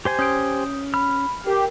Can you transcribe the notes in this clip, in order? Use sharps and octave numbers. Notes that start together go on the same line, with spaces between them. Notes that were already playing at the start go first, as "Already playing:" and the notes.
G4 C5 G#5
C#4 D#6 G6 D7
B5 F6
G4 A#4